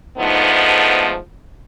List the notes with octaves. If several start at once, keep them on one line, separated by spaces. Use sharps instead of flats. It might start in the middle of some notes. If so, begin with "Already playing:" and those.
G#2 D3 F3 A3 B3 D#4